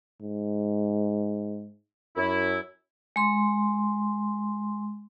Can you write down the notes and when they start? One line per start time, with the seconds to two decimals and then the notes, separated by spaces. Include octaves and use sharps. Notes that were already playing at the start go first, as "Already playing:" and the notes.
0.22 G#2
2.17 F#2 E4
3.16 G#3 C6